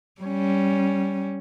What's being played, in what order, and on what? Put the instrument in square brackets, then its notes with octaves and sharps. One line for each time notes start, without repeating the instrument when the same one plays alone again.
[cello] G3 C#4